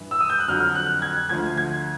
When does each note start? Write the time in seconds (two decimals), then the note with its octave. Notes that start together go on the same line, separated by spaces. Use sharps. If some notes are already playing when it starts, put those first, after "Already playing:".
Already playing: G2 E3
0.11 E6
0.20 D#6
0.30 G6
0.40 F#6
0.48 F2 D3 F#3 F6
0.75 F#6
1.02 G#6
1.29 D2 D3 F3 G#6
1.57 G#6